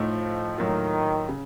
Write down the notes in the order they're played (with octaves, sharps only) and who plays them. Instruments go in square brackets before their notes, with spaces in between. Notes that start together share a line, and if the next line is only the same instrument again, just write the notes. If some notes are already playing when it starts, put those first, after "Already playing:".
Already playing: [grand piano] A2 A3 D#4 [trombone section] F3
[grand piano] A2 F#3 A#3 F4 [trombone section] D#3
[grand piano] C#3